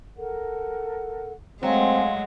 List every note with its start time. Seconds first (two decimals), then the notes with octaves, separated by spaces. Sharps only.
0.16 A4 A#4 F#5
1.63 F#3 G#3 A3 C4 F5 G#5 C6